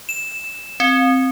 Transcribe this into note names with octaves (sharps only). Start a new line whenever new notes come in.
E7
C4